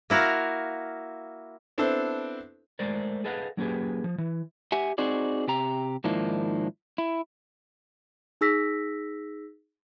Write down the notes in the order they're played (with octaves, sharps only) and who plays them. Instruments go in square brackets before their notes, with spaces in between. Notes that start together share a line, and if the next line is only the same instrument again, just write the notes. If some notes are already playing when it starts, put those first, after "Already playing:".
[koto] A#3 E4 F#4 A#4 F5
[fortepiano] B3 C4 D4 E4 A4 C5
[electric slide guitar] G#3 A3 A#4 C5 D5
G#4 A4 B4 D#5 F5 F#5
F#3 A#3 C#4 G4 G#4 B4
F3
E3
G4 E5 F#5 G#5
C4 D#4 F#4 G#4 D5
C3 G4 A#5
G#2 D#3 F3 A#3 D4 E4
E4
[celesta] D#4 G#4 E6 A#6 B6